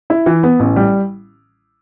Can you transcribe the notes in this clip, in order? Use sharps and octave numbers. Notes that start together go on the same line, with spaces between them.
E4
E3
B3
A1
G3